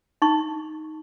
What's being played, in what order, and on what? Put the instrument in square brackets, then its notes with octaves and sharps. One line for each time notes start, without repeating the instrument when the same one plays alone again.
[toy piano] D#4 C#6